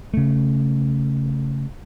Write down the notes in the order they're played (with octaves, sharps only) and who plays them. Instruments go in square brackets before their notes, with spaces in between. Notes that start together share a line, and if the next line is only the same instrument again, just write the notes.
[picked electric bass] C#3 A3